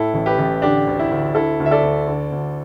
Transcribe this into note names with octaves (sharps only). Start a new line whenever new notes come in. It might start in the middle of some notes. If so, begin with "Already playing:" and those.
Already playing: A2 E4 A4
A1
G4 B4
A1
D3 D4 G4
D2
E4
D2
D3 E4 A4
D2
E5
A4 D5
D2
D3
D2